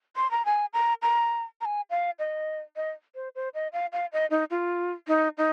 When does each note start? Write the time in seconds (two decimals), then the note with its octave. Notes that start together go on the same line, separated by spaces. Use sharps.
0.16 C6
0.31 A#5
0.45 G#5
0.73 A#5
1.02 A#5
1.61 A#5
1.65 G#5
1.90 F5
2.19 D#5
2.76 D#5
3.15 C5
3.35 C5
3.54 D#5
3.73 F5
3.92 F5
4.12 D#5
4.31 D#4
4.50 F4
5.08 D#4
5.38 D#4